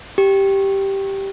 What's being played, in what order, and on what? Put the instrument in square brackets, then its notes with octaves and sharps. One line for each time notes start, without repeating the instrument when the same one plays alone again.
[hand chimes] G4